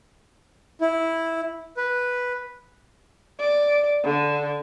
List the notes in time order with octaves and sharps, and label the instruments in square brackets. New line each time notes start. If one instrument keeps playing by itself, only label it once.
[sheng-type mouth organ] E4
B4
[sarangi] D5
D3